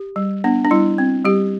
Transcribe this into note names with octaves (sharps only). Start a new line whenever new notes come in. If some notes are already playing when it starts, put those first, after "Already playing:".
Already playing: G4
G3
B3 D4
D4
G3 E4
C4
G3 G4